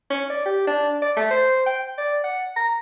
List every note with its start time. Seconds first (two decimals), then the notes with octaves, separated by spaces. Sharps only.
0.10 C#4
0.30 D5
0.46 G4
0.67 D4
1.02 D5
1.16 A3
1.31 C5
1.66 G5
1.98 D5
2.24 F#5
2.56 A#5